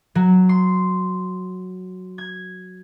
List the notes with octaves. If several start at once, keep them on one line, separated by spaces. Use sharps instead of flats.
F#3
C6
G#6